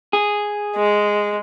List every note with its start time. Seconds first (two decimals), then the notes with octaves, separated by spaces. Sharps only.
0.13 G#4
0.76 G#3